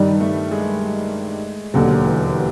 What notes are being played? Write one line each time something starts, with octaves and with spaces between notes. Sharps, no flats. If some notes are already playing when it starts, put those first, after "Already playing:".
Already playing: G2 D#3 G3
A3
G#3
E1 D#2 D3 F#3
E3
E3